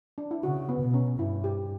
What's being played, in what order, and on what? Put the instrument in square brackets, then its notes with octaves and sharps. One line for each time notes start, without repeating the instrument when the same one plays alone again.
[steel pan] D4
E4
[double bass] C#3 [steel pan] F#4
[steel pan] B3
[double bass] B2
[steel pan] C#4
[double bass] G2 [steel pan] E4
[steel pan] G4